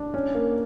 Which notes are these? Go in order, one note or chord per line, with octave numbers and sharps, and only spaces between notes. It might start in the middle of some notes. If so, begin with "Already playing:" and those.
Already playing: D4 D5
C#4
A#3